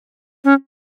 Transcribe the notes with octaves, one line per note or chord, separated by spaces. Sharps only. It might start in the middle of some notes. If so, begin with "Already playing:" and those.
C#4